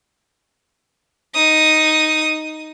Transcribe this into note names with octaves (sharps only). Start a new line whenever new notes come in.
D#4 D#6